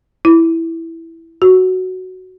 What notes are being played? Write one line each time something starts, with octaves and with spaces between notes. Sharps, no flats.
E4
F#4